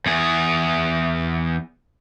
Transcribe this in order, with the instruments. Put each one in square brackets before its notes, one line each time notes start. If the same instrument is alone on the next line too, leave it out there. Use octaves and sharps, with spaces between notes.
[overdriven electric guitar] E2 G#4